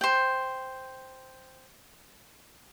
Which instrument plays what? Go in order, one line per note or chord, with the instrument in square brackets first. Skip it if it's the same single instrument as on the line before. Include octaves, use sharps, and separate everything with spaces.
[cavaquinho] C5 G5